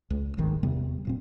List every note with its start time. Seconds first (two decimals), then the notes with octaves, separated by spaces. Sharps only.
0.10 C#2
0.37 D1 G1 G#2 D#3
0.63 E2 C3 G3 B3
1.05 D1 A#2 C4